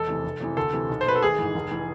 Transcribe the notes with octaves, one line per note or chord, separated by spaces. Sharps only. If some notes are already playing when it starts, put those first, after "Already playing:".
Already playing: E1 A4
E2 C3 E3
F1
E2 C3 E3
D2 A4
C3 E3
B1
C5
B2 B4
A4
G#1 G#4
G#2 E3
F1
E3